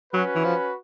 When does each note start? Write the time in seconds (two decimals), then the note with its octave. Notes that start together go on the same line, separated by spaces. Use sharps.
0.13 F#3 C#4 F#4 B4
0.35 E3
0.45 F3